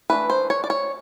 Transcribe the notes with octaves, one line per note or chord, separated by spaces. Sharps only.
E3 A3 D4 B4
C5
C#5
D5
C#5